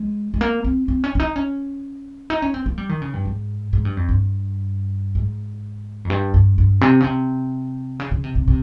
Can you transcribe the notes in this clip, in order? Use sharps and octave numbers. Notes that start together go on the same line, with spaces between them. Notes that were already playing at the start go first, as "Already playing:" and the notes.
Already playing: G#3
G#3
A#3
C4
C4
C#4
C#4
D#4
C#4
D#4
C#4
C4
A#3
G3
D#3
C#3
G2
G#2
G#2
G2
F2
G2
G#2
F2
G2
G2
G2
C3
C#3
C3
C#3
C#3
C3
C3
C3